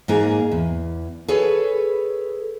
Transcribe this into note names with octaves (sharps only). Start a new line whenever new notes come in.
G#2 A#3 G#4 A#5
E2
G#4 A4 B4 C#5